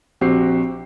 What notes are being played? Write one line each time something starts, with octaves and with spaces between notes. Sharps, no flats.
A#1 C4 F#4 G4 C7